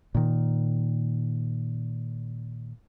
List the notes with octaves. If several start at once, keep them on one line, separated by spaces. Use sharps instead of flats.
A#2 D#3